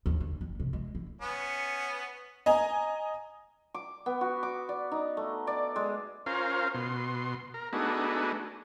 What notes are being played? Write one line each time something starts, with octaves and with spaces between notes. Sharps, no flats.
D#2
D3
F#1
C3
G#3
E4
B3 C#4
D#5 G#5 A#5
D6
B3
F#4
D6
D5
D#4
A3
D5
G#3
C#4 F4 A#4 C5 F5
B2 C6
A#4
A3 B3 D4 D#4 F#4 G#4